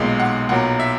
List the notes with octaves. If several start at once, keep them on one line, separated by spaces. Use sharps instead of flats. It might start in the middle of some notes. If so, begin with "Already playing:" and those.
Already playing: B1 A#2 G#3
F#5
B1 A#2 F#3 F#5
E5